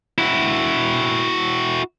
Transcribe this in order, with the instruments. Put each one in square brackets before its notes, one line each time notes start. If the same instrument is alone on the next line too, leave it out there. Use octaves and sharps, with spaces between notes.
[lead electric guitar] E4 F#4